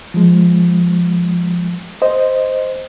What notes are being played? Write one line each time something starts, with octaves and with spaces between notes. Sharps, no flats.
F3 G#3
C5 D#5